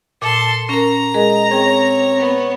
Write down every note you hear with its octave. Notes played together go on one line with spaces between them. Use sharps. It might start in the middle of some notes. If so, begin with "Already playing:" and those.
A#2 A4 C6
C#4 A#4 A#5
G#3 G#4 A#4 D#5
C4 G#4 C#5 G5 A#6
B3